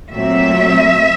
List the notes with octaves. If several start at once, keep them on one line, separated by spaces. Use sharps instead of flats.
A#2 F#3 A3 C4 E5